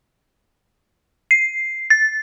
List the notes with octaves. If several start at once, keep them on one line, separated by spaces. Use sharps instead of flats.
C7
A6